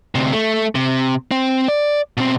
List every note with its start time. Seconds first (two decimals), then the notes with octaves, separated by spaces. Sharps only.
0.15 D2 C3
0.33 A3
0.75 C3
1.31 C4
1.68 D5
2.17 B2 C4